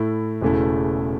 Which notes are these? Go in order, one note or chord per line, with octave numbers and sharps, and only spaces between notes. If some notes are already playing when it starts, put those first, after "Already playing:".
Already playing: A2 A3 E4
E1 E2 C#3 A3 E4